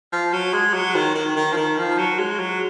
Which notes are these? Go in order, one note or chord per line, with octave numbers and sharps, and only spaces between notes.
F3
F#3
G#3
F#3
D#3
D#3
D#3
F3
D#3
F3
F#3
G#3
F#3